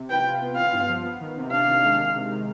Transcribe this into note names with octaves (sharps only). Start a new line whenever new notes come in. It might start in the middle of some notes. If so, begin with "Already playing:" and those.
Already playing: C3
B4 G5
F4
B3
F4 F5
G2
F3
B3
D#3
C3
D4 F5
D#3
G#3
D#3
C3
D#3